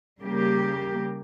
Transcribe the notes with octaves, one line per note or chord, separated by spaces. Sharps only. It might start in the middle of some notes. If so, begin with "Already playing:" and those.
C#3 G3 A#3 G4